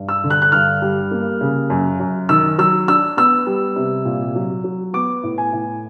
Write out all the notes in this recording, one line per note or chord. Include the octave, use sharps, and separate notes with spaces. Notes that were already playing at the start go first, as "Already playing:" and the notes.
Already playing: G2
E6
D3
F#6
F#6
G2 F6
G3
A#3
C#3
F#2
F#2
D#3 E6
F#3 E6
D4 E6
B3 E6
G3
C3
A#2
F#3
F#3
B3 D6
A2
G#5
A2